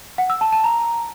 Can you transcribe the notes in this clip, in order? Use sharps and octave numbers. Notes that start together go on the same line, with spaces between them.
F#5
E6
A5
A5
A#5